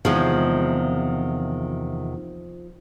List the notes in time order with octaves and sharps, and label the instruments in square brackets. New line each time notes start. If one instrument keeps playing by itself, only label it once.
[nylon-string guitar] E2 C3 D#3 [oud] F3 G#3